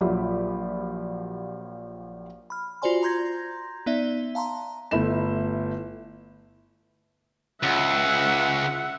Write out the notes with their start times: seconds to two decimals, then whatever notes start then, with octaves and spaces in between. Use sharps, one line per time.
0.01 A#1 F#3 F4 G4 E5 B5
2.50 B5 F6
2.82 F4 F#4 C5 D5 G#5 C6
3.03 A#5 C6 G6 G#6 A#6
3.86 B3 D#4 D5 E5 G7
4.35 F5 A5 A#5 C6
4.91 G1 A3 E4 E7
7.63 C#2 E5 F#5